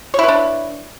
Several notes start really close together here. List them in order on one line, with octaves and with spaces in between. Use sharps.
C#5 E4 B4 D4